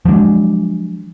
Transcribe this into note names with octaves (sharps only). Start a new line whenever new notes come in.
F3 F#3 G#3 D4